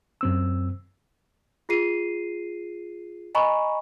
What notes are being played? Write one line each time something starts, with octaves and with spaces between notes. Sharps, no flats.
F#2 C4 E6
F4 G#4 C7 D#7
D#5 G#5 A#5 B5 C#6